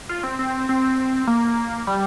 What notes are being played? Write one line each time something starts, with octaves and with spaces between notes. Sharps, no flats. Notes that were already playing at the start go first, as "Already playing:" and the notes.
F4
C4
C4
C4
A#3
G3